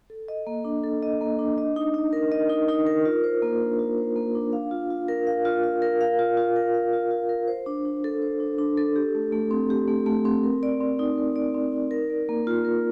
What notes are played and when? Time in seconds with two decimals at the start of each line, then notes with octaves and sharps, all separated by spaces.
0.10 A4
0.28 D#5
0.47 A#3
0.65 D4
0.84 A4
1.02 D#5
1.21 A#3
1.39 D4
1.58 D#5
1.76 D#4
1.94 D#4
2.13 A#4
2.32 D#5
2.49 D#4
2.68 D#4
2.87 A#4
3.05 F4
3.24 C5
3.42 A#3
3.61 D4
3.79 F4
3.98 C5
4.16 A#3
4.35 D4
4.53 F5
4.71 F4
4.90 F4
5.08 A#4
5.27 F5
5.45 F4
5.64 F4
5.82 A#4
6.01 F5
6.19 F4
6.37 F4
6.56 A#4
6.74 F5
6.93 F4
7.11 F4
7.29 A#4
7.48 C5
7.66 D4
7.85 D4
8.04 A4
8.22 C5
8.40 D4
8.58 D4
8.78 A4
8.96 G4
9.15 A3
9.32 A3
9.51 C4
9.70 G4
9.88 A3
10.06 A3
10.25 C4
10.43 A#4
10.63 D5
10.81 C4
10.99 D#4
11.17 A#4
11.36 D5
11.54 C4
11.73 D#4
11.91 A#4
12.10 D5
12.29 A#3
12.47 F4
12.65 A#4